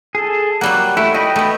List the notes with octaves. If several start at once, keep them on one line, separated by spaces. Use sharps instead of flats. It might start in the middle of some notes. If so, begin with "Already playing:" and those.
G#4 A4
F#3 G3 A#3 F#5
A3 E4
F#4 D#5 G5 B5
A3 B3